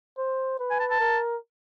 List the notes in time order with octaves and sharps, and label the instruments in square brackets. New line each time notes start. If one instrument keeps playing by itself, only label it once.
[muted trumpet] C5
B4
[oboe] G#5
A5
A5
[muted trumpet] A#4